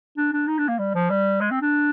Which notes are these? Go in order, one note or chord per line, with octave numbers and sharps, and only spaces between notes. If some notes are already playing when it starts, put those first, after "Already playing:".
D4
D4
D#4
D4
A#3
G3
F3
G3
G#3
C4
D4